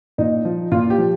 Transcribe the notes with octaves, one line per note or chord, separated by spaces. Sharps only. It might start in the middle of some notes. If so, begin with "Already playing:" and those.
A#2 D#4
F3
A#2 F4
G4
F3